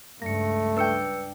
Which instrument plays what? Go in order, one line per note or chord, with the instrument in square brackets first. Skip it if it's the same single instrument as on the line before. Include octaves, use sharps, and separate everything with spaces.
[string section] C#2 G2 [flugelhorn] A3 [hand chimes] A#6 C#7
[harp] D4 G5 [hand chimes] B4 E6 C#7